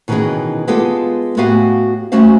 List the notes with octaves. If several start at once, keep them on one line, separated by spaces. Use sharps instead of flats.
B2 D#3 E3 C#4 D#4 G#4
G#3 B3 F4 G4 A4
A2 B3 F#4 G4 F5 G#5
G3 A3 C#4 F#4 C5 F5